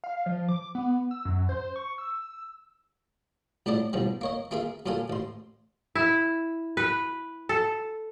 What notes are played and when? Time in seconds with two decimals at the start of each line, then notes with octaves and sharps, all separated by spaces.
0.04 F5
0.26 F3
0.49 D6
0.75 B3
1.11 E6
1.25 F#2
1.49 C5
1.76 C#6
1.98 E6
3.66 A#1 A2 A3 D4 D5 D#5
3.93 B1 E2 F3 G3
4.21 A#3 C#5 D#5
4.51 A#3 F4 G#4 E5 F5
4.86 F#2 A#2 F4 A4 A#4 G#5
5.10 A1 C6
5.95 E4
6.77 B4
7.49 A4